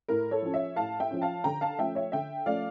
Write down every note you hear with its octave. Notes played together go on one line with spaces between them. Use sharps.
A2 A#4
A4 C#5
F3 C#4
C#5 E5
A2 F5 A5
E5 G5
F3 C#4
F5 A5
D3 G5 A#5
F5 A5
F3 A3 C#4 E5 G5
C#5 E5
D3 E5 G5
F3 A3 C#4 D5 F5